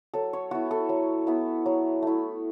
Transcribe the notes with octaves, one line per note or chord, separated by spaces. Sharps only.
F#3 A4
C#5
B3 E4 F#4
A4
F#3
B3 E4
F#3
A3 E4